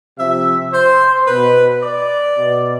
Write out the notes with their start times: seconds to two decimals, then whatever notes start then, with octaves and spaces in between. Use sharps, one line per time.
0.18 C3 F3 E5
0.73 C5
1.28 B2 B4
1.83 D5
2.37 B2